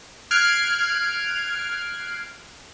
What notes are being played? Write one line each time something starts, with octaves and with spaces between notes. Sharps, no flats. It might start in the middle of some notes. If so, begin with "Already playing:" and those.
F6 F#6 G#6 C7 D7